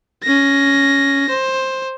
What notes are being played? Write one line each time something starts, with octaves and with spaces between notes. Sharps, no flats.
C#4 A#6
C5